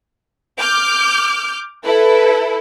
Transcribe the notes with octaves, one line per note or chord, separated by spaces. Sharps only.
D6 F6 G6
E4 A4 B4